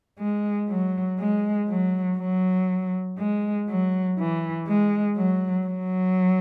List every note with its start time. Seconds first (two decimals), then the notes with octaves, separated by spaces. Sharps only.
0.19 G#3
0.69 F#3
1.19 G#3
1.68 F#3
2.18 F#3
3.18 G#3
3.68 F#3
4.19 E3
4.67 G#3
5.17 F#3
5.67 F#3